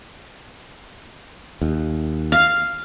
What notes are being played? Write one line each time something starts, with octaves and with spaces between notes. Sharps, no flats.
D#2
F5